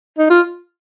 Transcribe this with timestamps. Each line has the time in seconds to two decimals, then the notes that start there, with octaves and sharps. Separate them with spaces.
0.18 D#4
0.30 F4